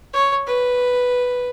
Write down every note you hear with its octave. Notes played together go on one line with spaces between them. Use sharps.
C#5
B4